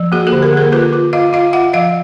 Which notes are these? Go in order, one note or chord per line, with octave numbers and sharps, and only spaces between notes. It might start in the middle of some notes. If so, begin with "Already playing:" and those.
Already playing: F3
A#3 F#4 G#4
G4 A4
D3
G#4 A#4
A#3 G#4 A#4
F4 A4 B4
F4
F4 D#5 F5
F4 D#5 F5
F4 E5 F#5
F3 D#5 F5